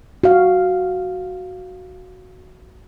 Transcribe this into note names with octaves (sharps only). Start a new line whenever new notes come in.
F#4 F5